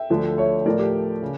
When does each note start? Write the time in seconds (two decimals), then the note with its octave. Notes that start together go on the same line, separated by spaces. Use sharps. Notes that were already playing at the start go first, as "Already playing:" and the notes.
Already playing: E5 G5
0.10 D2 D3 F3 A3
0.38 C#5 E5
0.65 A2 F3 A3 A#4 D5
0.79 G4 A#4
1.22 C#3